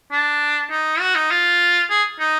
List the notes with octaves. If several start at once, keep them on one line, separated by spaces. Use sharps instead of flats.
D4
D#4
F#4
D#4
F4
G#4
D#4